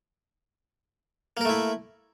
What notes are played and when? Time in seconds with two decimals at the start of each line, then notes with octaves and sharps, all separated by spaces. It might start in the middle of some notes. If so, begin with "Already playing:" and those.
1.37 A#3
1.41 A#4
1.45 A3
1.49 E4